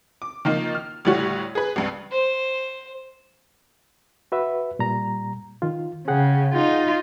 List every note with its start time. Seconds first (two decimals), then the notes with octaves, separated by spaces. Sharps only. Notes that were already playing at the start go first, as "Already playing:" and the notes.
0.22 D6
0.45 D#3 F3 A#3 D#4 F4
0.75 F6
1.05 D2 A2 G3 F#4 C#5
1.55 G#4 B4
1.76 C#2 G2
2.12 C5
4.32 F#4 B4 E5
4.79 A#2 G3 A#5
5.62 D#3 F4
6.08 C#3 G#4 F#5 G5
6.54 D#4 F4